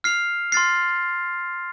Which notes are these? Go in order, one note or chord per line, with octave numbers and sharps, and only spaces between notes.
F6 C7 F7
C6 F6 A6 C7